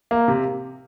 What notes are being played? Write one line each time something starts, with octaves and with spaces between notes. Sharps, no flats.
A#3
C3